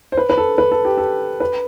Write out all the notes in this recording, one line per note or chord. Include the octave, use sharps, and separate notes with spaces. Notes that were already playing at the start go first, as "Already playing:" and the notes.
C5
B4
B4
A4
B4
A4
G4
A4
B4